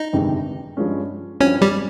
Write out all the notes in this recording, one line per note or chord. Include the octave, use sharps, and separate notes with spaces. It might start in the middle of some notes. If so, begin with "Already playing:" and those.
Already playing: D#4 D#5
G1 F2 C3 D#3 G#3
G2 F3 G#3 C#4
G2 F3 C4 C#4 C#5
G3 G4